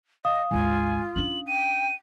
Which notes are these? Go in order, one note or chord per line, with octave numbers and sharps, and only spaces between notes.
D#5 F5 D#6
G#1 D2 F4 G#5
C#4 D4 F#7
G5 D#7